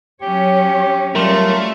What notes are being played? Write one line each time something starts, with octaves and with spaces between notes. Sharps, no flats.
F#3 C#4 G4 C#5
F#3 G3 A3 C#4 F4 A#4